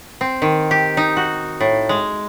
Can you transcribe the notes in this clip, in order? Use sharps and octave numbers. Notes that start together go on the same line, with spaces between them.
C4
D#3
G4
D#4
F#4
A2
G#3